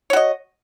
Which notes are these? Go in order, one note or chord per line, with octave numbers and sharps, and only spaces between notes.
F#4 C#5 D#5